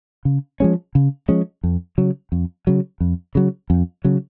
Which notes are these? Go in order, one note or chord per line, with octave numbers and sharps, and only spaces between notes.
C#3
F3 G#3 C#4
C#3
F3 G#3 C#4
F2
C#3 F#3
F2
C#3 F#3
F2
C#3 F#3
F2
C#3 F#3